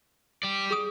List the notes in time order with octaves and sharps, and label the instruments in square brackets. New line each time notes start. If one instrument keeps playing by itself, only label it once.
[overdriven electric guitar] G4 D5
[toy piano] G#4 D#6